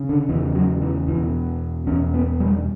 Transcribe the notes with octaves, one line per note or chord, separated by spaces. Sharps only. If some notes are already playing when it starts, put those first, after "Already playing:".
Already playing: C#3
D3
E2 C#3 E3
F#3
E3
E2 B2 E3
E2 B2 C#4
B3
G3